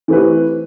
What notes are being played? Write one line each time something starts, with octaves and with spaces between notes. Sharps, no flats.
E3 A3 C4 G4 B4